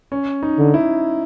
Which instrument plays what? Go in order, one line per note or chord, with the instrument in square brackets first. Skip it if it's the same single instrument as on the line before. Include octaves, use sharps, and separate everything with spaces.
[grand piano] C#4
D#4
[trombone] D3
[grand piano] E4